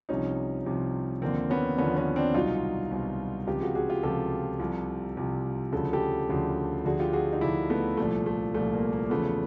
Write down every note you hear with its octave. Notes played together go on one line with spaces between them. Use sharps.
C2 C3 F3 C#4 D#4
C2 C3 F3
D#2 D3 F3 A#3 C4
B3 C#4
D#2 D3 F3 B3 C#4
B3 C#4
C4 D4
C2 B2 F#3 D#4 F4
C2 B2 F#3
C#2 C3 F3 F4 G4
F#4 G#4
F#4 G#4
F4 G4
C#2 C3 F3 G4 A4
C2 C3 F3
C2 C3 F3
D2 C#3 F3 A4
G4 A4
D2 C#3 F3
D2 D3 F3 F#4 G#4
F4 G4
F#4 G#4
D#4
D2 D3 F3 D4 E4
A3 B3
C2 A#2 F3 A3
A3
C2 A#2 F3 A3
A#3
A#3
A#3
E2 C#3 F3 A3 B3